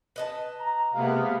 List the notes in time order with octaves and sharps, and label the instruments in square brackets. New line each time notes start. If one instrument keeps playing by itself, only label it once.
[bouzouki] B4 D#5 A5
[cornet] A#5
[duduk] C3 [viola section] G#3 A#3 B3 [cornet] F5